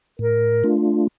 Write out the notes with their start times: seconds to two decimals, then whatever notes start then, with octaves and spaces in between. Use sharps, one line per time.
0.19 A2 A#4
0.64 A3 D4 F4